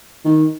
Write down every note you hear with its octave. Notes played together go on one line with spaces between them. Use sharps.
D#3